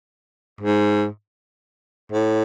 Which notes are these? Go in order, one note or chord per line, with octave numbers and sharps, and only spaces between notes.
G#2
A2